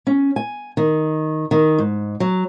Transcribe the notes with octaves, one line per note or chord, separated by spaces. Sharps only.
C#4
G#5
D#3
D#3
G#2
F#3